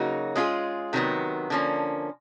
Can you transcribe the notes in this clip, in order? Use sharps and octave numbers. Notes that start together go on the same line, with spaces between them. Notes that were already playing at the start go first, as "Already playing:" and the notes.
Already playing: C#3 F#3 A#3 D#4 F#4
G#3 C#4 F4 G#4
C3 D#3 F#3 B3
D3 F3 A#3 C#4